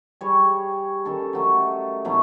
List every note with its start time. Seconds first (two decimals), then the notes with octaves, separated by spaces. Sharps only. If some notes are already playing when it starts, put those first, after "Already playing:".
0.21 G3 G#4 C#5
1.05 D#3 C#4 A4
1.33 D#3 F#3 A3
2.05 B2 E3 F#3